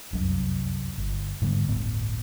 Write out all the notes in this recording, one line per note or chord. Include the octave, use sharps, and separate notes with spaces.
F1 C2 F#2
G1
G#2 D3 G3 B3
D1 G1 A2 B3